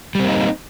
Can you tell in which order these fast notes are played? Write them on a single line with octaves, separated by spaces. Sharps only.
G3 C4 A#3 D#4